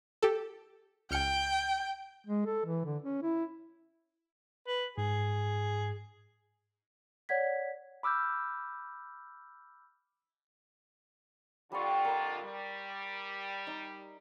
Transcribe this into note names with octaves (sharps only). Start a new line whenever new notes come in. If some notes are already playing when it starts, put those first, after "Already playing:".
G4 A4
C#2 G5 F6 C#7
G#3
A4
E3
D3
C#4
E4
B4
G#2 G#4
C#5 D5 F#5 G#6 B6
B5 D6 E6 F6 G6
F2 D3 G3 F4 C6 C#6
A#4 C6
G3
D#4